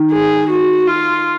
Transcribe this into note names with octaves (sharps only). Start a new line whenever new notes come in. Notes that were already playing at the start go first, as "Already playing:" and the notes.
Already playing: D#3
G#4
F#4
F4